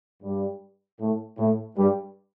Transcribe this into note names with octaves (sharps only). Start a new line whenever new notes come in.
G2 G3
A2 A3
A2 A3
G2 G3